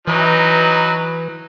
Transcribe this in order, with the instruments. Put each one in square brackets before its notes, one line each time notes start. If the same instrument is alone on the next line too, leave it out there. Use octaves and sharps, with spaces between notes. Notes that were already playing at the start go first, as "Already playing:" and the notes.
[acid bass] E3 [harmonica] F#3 D#4 B4